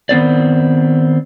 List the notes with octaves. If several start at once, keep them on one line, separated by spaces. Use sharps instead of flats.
D#3 B3 C4 D5